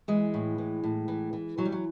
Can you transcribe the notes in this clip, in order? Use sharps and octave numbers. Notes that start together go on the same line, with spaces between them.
E3 G#3
A2
E3
A2
E3
E3
E3 F#3
G3
F#3